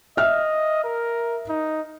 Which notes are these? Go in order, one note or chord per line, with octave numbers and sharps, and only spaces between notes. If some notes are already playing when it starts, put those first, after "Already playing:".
D#5 E5 F6
A#4
D#4